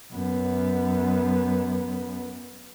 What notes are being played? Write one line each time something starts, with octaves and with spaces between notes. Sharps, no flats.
F#2 B3